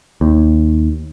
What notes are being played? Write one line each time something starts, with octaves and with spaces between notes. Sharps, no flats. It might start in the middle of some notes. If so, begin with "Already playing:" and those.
D#2